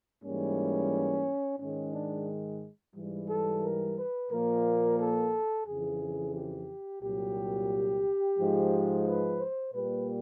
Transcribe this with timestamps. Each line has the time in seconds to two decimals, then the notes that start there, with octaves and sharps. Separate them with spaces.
0.24 G#2 E3 G3 A#3 C#4
1.60 G#2 D#3 G#3 C#4
1.93 D4
2.96 G#2 E3 G3
3.29 A4
3.63 A#4
3.97 B4
4.31 A#2 F3 A#3 A#4
4.99 A4
5.67 F2 C#3 E3 G#4
6.35 G4
7.02 C2 A#2 F#3 G4
8.38 G#2 F3 G#3
9.06 B4
9.40 C5
9.74 A#2 G3 A#3 B4